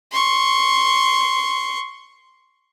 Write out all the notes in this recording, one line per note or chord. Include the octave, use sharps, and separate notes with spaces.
C6 C#6